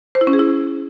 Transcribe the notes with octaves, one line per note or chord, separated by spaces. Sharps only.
C5
E4
C#4
G#4
E4